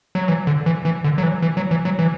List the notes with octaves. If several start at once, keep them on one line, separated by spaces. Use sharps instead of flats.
F#3
E3
D3
E3
E3
D3
F#3
E3
E3
F#3
E3
F#3
E3